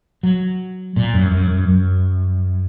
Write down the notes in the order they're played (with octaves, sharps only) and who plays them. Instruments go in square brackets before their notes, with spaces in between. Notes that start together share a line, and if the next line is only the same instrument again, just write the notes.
[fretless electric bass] F#3
A#2
F#2
F#2
F#2
F#2